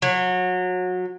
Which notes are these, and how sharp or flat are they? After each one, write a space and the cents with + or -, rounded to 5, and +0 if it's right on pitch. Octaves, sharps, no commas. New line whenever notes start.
F#3 -25